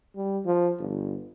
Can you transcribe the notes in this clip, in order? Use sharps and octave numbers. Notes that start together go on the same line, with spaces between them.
G3
F3
G1